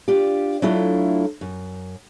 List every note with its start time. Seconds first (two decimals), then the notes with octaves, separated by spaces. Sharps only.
0.08 D4 F4 G4
0.62 F#3 A3 D4 E4 F4 A4
1.41 F#2